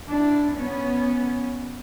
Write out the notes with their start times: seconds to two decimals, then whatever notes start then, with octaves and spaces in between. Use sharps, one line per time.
0.10 D4 E4
0.57 B3 C#4 C#5